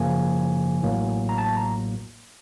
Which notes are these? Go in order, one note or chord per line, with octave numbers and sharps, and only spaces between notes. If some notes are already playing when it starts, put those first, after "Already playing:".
Already playing: F#2 C#3 F3 A#3 G#5
A1 A2 F#3 A#3
A#5
A5
A#5